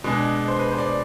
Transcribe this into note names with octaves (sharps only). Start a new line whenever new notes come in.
B2 G#3 D4 G#4
C5
B4
C5
D5